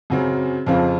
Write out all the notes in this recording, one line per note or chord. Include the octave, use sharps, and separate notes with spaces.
F#2 C#3 F#3 C4
F2 C#3 F3 C4 F4